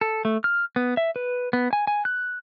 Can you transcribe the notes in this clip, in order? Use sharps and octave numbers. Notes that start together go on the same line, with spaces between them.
A4
A3
F6
B3
E5
B4
B3
G#5
G#5
F#6